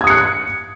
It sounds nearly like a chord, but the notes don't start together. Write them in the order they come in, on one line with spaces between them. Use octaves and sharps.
G#6 D#6 C#7 F#6